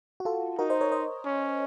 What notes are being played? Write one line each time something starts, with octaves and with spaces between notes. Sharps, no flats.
F#4
F4 A4
D#4 F#4 A#4
C5 D#5
A#4 C#5
C5 D#5
C#4